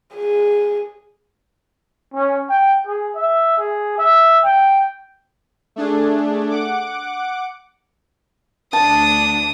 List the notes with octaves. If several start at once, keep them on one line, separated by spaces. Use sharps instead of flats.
G#4
C#4
G5
G#4
E5
G#4
E5
G5
A3 D4 G#4
F#5 D6
D2 D4 A5 D#6